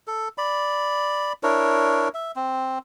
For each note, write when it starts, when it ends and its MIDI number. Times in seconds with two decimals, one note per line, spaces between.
0.07 0.28 69
0.38 1.33 74
0.38 1.33 83
1.43 2.09 62
1.43 2.09 64
1.43 2.09 70
1.43 2.09 73
2.14 2.32 76
2.36 2.78 60